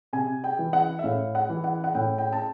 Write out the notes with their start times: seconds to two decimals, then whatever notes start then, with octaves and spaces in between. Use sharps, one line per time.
0.13 C3 G#5
0.44 G5
0.59 E3
0.73 F#5
0.99 E5
1.04 A2 F5
1.35 F#5
1.50 E3
1.64 F#5
1.84 F#5
1.95 A2 G5
2.18 G5
2.33 A5